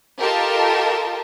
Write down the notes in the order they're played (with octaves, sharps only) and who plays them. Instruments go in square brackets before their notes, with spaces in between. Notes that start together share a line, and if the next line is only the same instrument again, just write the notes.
[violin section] F4 G4 A4 A#4 D#5 A5